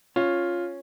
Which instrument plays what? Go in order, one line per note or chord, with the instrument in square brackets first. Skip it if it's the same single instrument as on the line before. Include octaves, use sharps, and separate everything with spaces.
[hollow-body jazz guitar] C#4 [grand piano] F4